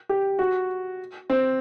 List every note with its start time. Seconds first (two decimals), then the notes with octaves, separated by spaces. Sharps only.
0.09 G4
0.39 F#4
1.30 C4